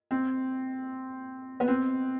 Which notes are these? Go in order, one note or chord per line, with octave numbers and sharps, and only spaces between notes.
C4
B3
C4